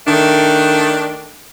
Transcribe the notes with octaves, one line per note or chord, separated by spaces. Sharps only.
D#3 A3 D4